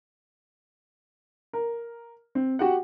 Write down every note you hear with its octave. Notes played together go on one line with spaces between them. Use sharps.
A#4
C4
F#4 G4 F#5